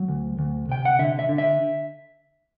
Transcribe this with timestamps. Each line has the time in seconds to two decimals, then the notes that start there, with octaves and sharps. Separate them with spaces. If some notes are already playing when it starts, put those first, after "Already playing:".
Already playing: F#3
0.09 D2
0.39 D2
0.69 C3 G5
0.85 F#5
0.99 D3 E5
1.19 E5
1.29 D3
1.38 E5